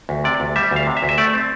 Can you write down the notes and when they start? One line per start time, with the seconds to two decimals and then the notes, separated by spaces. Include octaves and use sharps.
0.09 D2
0.24 C3 D5
0.40 D2
0.56 G3 E5
0.71 D2 F5
0.87 C3
0.97 E5
1.02 D2
1.09 E5
1.18 A3 D5
1.33 C4